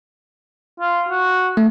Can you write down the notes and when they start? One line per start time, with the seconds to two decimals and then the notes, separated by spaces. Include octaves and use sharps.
0.80 F4
1.08 F#4
1.57 A3